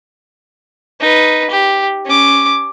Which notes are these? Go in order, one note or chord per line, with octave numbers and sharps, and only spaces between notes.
D#4 B4
G4
C#4 D6